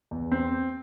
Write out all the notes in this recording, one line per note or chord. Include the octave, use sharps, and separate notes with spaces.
E2
C4